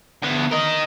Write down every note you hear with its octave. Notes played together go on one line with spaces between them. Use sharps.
D2 B3
A#4 D#5